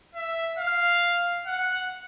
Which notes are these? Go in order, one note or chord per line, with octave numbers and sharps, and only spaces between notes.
E5
F5
F#5